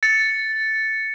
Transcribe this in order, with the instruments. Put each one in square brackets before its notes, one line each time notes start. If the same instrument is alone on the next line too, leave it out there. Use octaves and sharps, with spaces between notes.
[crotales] A6 C#7